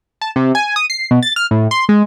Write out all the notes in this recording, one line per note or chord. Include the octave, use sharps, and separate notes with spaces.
A5
C3
G#5
D#6
C7
B2
A6
F6
A2
C6
G#3